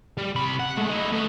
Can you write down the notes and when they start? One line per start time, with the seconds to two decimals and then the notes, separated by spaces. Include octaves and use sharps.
0.17 G3
0.35 C3 B5
0.60 F#5
0.78 G#3 A3
0.90 D#4 E4
1.12 A3 B3